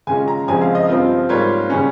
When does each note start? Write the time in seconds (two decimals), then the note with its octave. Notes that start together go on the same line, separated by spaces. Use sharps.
0.07 C#3 G#3 C#4 F4 G#5
0.28 A#5
0.48 F2 C#3 G#3 C4 G#5
0.62 F5
0.75 D#5
0.88 G2 F3 C4 F4
1.29 G#2 G3 A#3 F4 C#5
1.70 C#3 G3 C#4